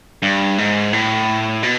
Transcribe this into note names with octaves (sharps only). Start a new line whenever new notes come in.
G2
G#2
A2
B2